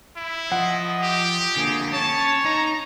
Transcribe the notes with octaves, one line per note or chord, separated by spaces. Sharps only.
E4
F3 D#5 F#5
G4
D3 A#3 G#4
C#4 C#5 A5
D#4 A#5